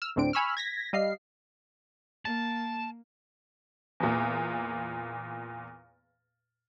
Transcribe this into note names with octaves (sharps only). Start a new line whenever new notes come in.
E6 F6
D2 A2 C4 D4 D7
G#5 B5 C#6 E6 F6
G#6 A#6 B6
G3 D#5 F5 C7
A#3 A5
E2 A#2